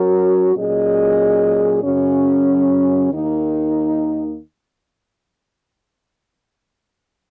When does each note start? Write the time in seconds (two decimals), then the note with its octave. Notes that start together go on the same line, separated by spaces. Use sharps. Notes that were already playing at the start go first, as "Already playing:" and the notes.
Already playing: F#3 C#4 F#4 A#4
0.54 A#2 F#3 C#4 G#4 D#5
1.82 F#2 C#3 F#3 C#4
3.11 D#2 D#3 A#3 D#4